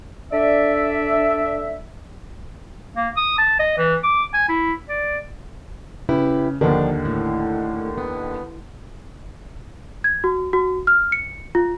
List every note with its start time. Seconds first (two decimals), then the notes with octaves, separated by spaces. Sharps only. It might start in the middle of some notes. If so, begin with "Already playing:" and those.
0.33 D4 A4 D5 E5
2.96 A#3
3.17 D#6
3.38 A5
3.60 D#5
3.78 E3
4.04 D6
4.34 G#5
4.49 E4
4.89 D5
6.09 C#3 E4 G4 B4
6.61 D#2 D3 D#3 F3 D4
7.05 A2
7.98 B3
10.04 G#6
10.24 F#4
10.53 F#4
10.87 F6
11.12 C#7
11.55 F4